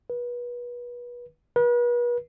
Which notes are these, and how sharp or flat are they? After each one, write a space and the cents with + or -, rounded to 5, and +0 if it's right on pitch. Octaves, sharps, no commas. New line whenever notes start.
B4 -30
B4 -40